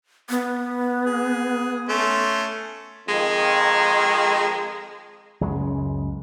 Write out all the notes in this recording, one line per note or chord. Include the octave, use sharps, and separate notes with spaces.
B3
G#4
A3 C#4 C6
F2 D#3 G#3
C#2 F#2 C#3 G#3